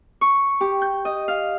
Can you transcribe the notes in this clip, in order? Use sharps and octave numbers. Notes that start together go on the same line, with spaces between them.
C#6
G4
G6
D#5
F5